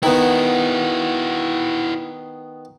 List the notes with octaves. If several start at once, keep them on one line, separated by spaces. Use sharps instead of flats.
D#3 B3 E4 F#4